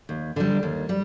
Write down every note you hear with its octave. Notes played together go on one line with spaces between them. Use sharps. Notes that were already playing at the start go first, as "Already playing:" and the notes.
D#2
D3 G3
D#2
G3